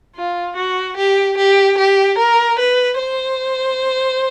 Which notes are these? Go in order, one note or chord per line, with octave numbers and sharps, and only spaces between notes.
F4
F#4
G4
G4
G4
A#4
B4
C5